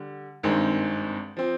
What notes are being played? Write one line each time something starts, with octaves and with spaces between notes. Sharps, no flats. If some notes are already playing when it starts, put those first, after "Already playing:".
Already playing: D3 G3
G#1 G2 D#3 G#3 C4
F3 C4